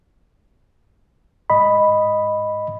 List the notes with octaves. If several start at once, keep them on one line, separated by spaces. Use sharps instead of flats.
G#2 D#5 B5